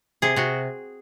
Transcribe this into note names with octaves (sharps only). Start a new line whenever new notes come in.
C3 G#4
C3 F#4